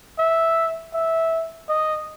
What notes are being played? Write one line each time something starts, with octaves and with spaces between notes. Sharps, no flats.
E5
E5
D#5